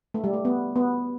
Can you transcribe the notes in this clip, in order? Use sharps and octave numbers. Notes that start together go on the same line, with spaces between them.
A3
G3
A3
B3
B3